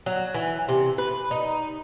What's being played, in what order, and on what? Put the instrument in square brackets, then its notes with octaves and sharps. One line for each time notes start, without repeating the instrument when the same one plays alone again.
[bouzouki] F#3
E3
C3
B4
D#4